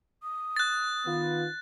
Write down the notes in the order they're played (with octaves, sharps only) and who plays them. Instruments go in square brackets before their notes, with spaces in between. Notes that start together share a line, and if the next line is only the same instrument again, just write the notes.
[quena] D#6
[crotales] F#6 A6
[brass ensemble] D#3 B3 F4